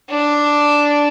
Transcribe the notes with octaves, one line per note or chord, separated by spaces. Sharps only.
D4